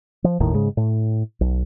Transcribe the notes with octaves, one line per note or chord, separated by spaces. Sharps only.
F3
G1 D#2 A2 D#3
G#2 C#3 G#3
A2
B1